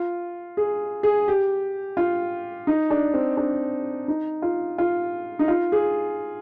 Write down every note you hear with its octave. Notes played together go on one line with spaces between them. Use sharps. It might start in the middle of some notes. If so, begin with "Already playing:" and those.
Already playing: F4
G#4
G#4
G4
F4
D#4
D4
C4
D4
D#4
F4
F4
D#4
F4
G#4